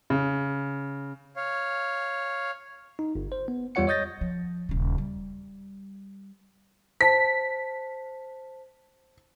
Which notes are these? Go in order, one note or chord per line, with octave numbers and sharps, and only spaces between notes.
C#3
C#5 F5
D#4
G1
C5
B3
E2 G3 F4 C#5 F#5 C#7
C#5 D#5 D#6 G6 A6 A#6
F3
D#1 C#3
G3
C5 A5 B6